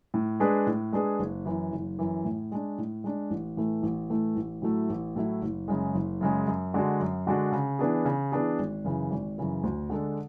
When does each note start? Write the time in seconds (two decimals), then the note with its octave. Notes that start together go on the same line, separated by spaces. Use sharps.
0.14 A2
0.40 G#3 D4 G#4 B4
0.67 A2
0.93 G#3 D4 G#4 B4
1.19 F#1
1.45 F#2 E3
1.72 F#1
1.99 F#2 E3
2.25 A2
2.52 G#3 D4
2.78 A2
3.04 G#3 D4
3.30 A1
3.57 A2 E3 A3
3.83 A1
4.10 A2 E3 A3
4.36 A1
4.62 A2 F#3 A3 E4
4.89 A1
5.16 A2 F#3 A3 E4
5.42 F#1
5.68 F#2 C#3 G#3
5.95 F#1
6.21 F#2 C#3 G#3
6.47 F#2
6.74 D3 G#3 D4 F#4
7.00 F#2
7.27 D3 G#3 D4 F#4
7.52 C#3
7.79 E3 B3 D4 G#4
8.05 C#3
8.32 E3 B3 D4 G#4
8.59 G#1
8.84 F#2 C#3 E3
9.11 G#1
9.38 F#2 C#3 E3
9.64 D2
9.90 D3 G#3 D4 A4